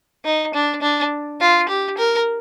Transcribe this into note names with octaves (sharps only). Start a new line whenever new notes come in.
D#4
D4
D4
F4
G4
A#4